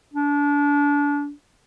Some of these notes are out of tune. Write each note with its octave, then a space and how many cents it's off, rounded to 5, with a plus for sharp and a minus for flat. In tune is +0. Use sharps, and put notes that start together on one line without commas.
D4 -30